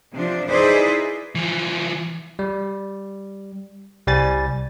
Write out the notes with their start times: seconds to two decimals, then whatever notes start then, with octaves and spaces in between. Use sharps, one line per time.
0.13 C3 F3 D4
0.48 D#4 E4 G#4 B4 C5 D5
1.35 E3 F3
2.39 G3
4.07 C2 G3 G#5 A6